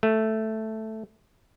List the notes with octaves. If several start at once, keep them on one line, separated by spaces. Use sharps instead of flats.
A3